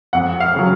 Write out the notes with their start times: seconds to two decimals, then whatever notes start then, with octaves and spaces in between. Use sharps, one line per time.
0.13 F2 F#5
0.40 F5
0.54 C#3 F#3